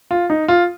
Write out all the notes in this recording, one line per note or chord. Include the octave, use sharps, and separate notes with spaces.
F4
D#4
F4